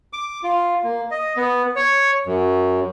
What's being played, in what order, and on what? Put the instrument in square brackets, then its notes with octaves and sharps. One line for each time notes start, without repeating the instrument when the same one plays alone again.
[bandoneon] D6
F4
A#3
D#5
B3
C#5
F#2